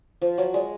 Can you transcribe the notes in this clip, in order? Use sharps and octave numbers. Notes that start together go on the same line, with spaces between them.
F3 C5
F#3 C#5
G#3 D5